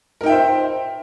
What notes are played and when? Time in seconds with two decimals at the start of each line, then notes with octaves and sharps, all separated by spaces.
0.21 A#4
0.24 D#4
0.26 G5
0.29 E5
0.32 C5